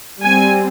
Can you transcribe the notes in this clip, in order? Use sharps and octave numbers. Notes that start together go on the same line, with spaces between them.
G3 C4 G#5